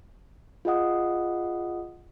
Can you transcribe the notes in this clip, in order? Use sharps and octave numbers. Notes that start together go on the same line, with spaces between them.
F4 G#4 D#5 F#5 D#6